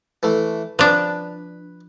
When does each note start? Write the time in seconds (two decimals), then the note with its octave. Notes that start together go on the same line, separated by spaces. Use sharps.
0.23 E3 A3
0.79 F3 D4 B4